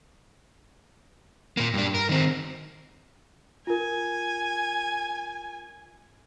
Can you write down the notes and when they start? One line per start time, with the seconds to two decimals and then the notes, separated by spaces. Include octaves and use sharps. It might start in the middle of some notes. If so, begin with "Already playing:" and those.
1.57 A#2 A#3
1.74 G2 D4
1.95 A#4
2.09 D#3 C4
3.67 F4 A#4 G#5